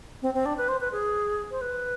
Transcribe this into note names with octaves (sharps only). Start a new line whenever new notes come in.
C4
C4
D4
B4
C5
B4
G#4
C5
B4